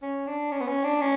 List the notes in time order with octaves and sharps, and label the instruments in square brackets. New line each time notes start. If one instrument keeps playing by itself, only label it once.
[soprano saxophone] C#4
D4
C#4
B3
C#4
D4
C#4